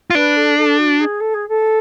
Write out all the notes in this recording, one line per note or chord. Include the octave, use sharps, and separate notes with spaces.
F4
D4 B4
A4
A4
F#4
G#4
A4
G#4
A4